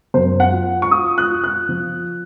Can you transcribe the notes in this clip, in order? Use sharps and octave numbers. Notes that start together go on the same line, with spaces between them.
F#2 C5
F#5
F4
C#6
F4 D#6
F#6
F4
F#6
F3